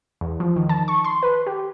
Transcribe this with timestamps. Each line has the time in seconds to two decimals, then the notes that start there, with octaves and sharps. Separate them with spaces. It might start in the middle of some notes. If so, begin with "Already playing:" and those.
0.21 E2
0.40 F3
0.56 D#3
0.69 A5
0.88 C#6
1.05 C6
1.23 B4
1.47 G4